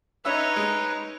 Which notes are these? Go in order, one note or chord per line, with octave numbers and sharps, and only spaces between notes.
C#4 D#4 B4 C#5 E5 E6
G#3